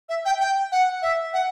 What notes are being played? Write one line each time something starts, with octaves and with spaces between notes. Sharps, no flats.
E5
G5
G5
F#5
E5
F#5